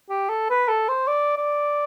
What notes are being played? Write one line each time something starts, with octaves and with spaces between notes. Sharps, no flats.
G4
A4
B4
A4
C5
D5
D5